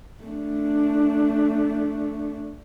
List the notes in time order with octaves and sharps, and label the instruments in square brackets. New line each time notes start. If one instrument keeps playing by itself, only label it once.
[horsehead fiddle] A3 D4